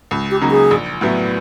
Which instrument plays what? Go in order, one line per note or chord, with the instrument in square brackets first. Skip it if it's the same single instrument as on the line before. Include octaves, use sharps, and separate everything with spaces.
[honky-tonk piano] C#2
[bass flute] G4
[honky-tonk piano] C#3 F#3 A#3 D#4
[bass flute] G#4
[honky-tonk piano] A#1
A2 F#3 B3 E4